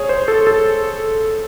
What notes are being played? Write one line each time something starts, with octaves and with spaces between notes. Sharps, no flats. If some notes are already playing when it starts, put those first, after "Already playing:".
Already playing: G#4 C#5
C5
A4
A4